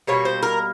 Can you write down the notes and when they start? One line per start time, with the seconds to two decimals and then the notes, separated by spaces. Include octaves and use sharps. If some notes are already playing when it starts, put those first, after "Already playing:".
0.07 B2 G3 A#3 C#5
0.25 C5
0.43 A#4